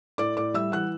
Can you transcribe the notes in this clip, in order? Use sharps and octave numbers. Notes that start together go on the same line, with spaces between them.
A2 D5 D6
A2 D5 D6
G3 E5 E6
E3 F#5 F#6